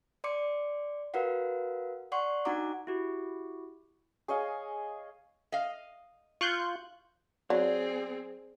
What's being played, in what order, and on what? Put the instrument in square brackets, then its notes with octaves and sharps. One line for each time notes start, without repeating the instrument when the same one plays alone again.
[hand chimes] D5 C6 D6 C#7
F#4 A#4 B4 F5 F#5
D5 F#5 C6 C#6
D4 D#4 F#4 F#5 A#5 D6
[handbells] E4 F#4 G4
[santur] G#4 C#5 D#5 F5
[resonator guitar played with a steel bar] D#5 F5
[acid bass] F4 [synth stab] C#6 F#6 G6
[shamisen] F#3 [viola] C4 G#4 [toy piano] D5